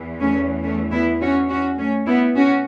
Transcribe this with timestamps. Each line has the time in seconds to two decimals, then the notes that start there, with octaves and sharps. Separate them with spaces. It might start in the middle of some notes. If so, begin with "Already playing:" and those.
Already playing: E2 E3
0.20 A3 C#4
0.63 A3 C#4
0.92 B3 E4
1.20 C#4 F#4
1.50 C#4 F#4
1.78 A3 C#4
2.07 B3 E4
2.35 A2 C#4 F#4